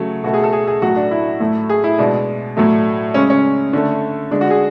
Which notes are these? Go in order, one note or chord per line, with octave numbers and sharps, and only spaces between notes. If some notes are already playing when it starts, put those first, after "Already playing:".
Already playing: C#3 F#3 A3
B2 A3 F#4
G#4
A4
G#4
G#4
A2 F#3 A3 F#4
D4
E4
A2 F#3 A3
G#4
E4
B2 G#3 D4
A2 F#3 A3
C#3 G#3 C#4
C#4
D3 A3
D3 G#3 D4
F#4
G#4